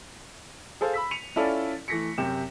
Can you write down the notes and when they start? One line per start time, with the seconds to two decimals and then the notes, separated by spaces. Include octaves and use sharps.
0.81 G#4 A4 C5 F5
0.94 B5 E6 B6
1.11 C#7 D#7 F7
1.36 C#4 E4 F4 A4 D5
1.88 E3 A3 A#6 B6 C#7
2.18 F#2 C3 G4 E7